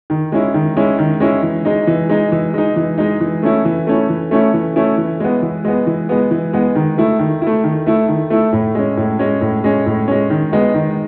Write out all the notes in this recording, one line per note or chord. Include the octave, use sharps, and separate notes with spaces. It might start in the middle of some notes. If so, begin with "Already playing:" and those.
D#3
G#3 C#4 E4
D#3
G#3 C#4 E4
D#3
G#3 C#4 E4
E3
G#3 D#4
E3
G#3 D#4
E3
G#3 D#4
E3
G#3 D#4
E3
A3 C#4 E4
E3
A3 C#4 E4
E3
A3 C#4 E4
E3
A3 C#4 E4
E3
G#3 B3
E3
G#3 B3
E3
G#3 B3
E3
G#3 B3
D#3
A3 E4
D#3
A3 E4
D#3
A3 E4
D#3
A3 E4
A2
G#3 C#4
A2
G#3 C#4
A2
G#3 C#4
A2
G#3 C#4
D#3
G#3 B3 D#4
D#3